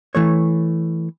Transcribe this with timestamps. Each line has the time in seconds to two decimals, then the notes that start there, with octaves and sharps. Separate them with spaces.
0.15 E3 A3 C#5